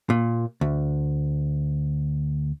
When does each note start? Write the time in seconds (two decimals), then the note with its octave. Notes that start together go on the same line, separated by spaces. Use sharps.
0.10 A#2
0.61 D2